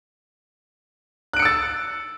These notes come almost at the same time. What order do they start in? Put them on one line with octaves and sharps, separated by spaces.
F#6 D7 C#7 E6 A6